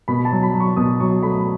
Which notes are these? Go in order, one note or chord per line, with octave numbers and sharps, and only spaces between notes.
B2 B5
A5
F#3
B5
F#3
C#6
B2 D#6
F#3 C#6
A3 B5